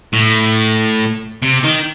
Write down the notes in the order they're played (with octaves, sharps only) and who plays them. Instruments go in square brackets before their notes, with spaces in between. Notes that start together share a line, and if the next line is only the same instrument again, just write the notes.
[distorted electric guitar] A2
C3
D#3